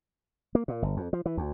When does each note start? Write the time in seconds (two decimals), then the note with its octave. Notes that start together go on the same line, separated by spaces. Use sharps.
0.55 A#3
0.68 A#2
0.82 G1
0.97 F2
1.13 F3
1.26 E3
1.37 D2